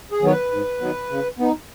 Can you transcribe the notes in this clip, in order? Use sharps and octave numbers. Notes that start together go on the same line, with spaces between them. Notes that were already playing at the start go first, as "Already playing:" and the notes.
G#4
D#3 F#3 B3 C#5
B4
G#2
D#3 F#3 B3
C#3
B3 D#4